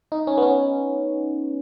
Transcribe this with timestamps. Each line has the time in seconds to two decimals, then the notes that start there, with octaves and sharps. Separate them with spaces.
0.12 D#4
0.27 C#4
0.38 B3
0.42 C#4